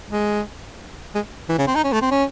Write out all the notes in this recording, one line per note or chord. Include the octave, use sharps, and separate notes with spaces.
G#3
G#3
E3
C#3
C4
D#4
C#4
A3
C4
C#4